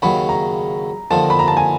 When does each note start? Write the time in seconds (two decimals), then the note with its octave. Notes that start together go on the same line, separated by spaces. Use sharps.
0.02 D#2 C#3 F#3 B5
0.29 A#5
1.11 D#2 D3 F3 A5
1.30 B5
1.39 A#5
1.48 A5
1.57 G#5